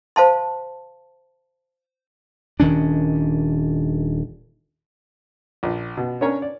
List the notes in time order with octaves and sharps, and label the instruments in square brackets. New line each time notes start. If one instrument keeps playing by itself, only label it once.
[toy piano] C5 F5 A5 C6
[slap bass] D#1 D#3 C#4 D4
[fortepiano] A#1
B2
C#4 D4 A#4 C#5 G#5 A#5
D5